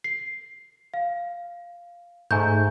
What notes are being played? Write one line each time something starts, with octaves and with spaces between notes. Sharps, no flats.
C7
F5
G#2 A3 G#5 A#5 G6